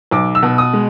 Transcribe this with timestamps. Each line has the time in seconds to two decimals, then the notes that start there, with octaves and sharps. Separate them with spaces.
0.11 B1 D6
0.35 E6
0.43 B2
0.58 D#6
0.73 G#3